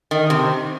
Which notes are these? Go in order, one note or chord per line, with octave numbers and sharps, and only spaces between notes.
D#3
C3